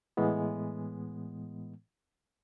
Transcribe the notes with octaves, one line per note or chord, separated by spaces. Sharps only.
A2 E3 G#3 B3